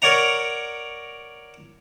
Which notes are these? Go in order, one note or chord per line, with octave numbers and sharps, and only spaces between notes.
A#4 C#5 D5 F#5 A#5